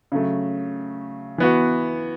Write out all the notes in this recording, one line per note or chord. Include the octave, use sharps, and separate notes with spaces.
C#3 F#3 A3
E3 B3 F#4